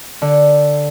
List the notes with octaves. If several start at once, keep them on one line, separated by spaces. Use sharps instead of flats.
D3